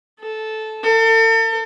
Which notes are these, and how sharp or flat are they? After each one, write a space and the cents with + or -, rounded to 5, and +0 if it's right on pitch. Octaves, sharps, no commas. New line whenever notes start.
A4 -10
A4 +40